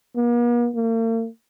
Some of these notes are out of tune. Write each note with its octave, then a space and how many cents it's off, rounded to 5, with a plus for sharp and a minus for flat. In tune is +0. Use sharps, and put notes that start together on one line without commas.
A#3 +45
A#3 -45